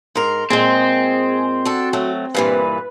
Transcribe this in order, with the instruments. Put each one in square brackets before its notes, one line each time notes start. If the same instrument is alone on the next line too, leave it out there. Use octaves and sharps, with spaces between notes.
[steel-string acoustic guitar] G#2 A#4 [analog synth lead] C6
[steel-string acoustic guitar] A#2 G#3 [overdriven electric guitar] C4 [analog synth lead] G#4
[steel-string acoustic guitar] D4 A4 [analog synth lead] F#4
[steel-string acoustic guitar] F#3 A3
[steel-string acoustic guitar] G2 A#2 E3 [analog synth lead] B4